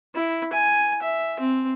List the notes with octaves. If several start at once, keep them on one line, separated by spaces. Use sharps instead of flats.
E4
G#5
E5
C4